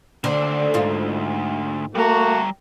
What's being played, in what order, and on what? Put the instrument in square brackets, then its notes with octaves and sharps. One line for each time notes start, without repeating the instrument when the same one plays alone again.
[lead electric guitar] D2 C5 [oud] D3
[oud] G#2 F4
[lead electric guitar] G3 A#5 [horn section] A3 A#3 F#4